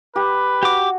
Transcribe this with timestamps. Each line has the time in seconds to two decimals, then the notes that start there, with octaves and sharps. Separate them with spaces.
0.16 G4 B4
0.63 F#4 G4 D6